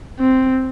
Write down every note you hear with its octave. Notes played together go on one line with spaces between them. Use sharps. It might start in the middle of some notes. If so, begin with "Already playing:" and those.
C4